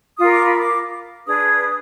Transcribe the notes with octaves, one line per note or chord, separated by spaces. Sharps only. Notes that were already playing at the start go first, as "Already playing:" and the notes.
F4 A#4 D#6
D6
B5
D6
D4 G#4 B4 D#6